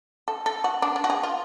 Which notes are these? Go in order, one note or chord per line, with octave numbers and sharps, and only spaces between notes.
A4
A4
F#4
D4
D4
F#4
G#4
F4